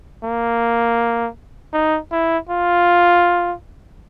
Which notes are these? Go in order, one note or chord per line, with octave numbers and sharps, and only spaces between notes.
A#3
D#4
E4
F4